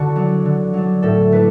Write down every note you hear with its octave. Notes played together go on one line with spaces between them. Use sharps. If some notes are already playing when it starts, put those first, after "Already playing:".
Already playing: D3 F#4 D5 A5
F#3 D4
D3
F#3 D4
A2 A4
A3 D4 B4